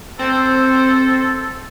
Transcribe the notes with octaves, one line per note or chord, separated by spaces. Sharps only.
C4 A4 C5